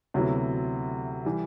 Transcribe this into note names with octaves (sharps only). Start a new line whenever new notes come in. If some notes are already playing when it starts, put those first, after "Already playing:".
D2 C3 F#3 B3 E4
E3 G3